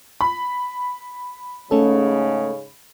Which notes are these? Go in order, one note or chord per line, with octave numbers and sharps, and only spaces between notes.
B5
G#2 C#3 A3 C#4 A4